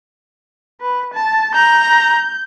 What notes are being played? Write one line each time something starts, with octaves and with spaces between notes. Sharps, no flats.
B4
A5
A#5 G6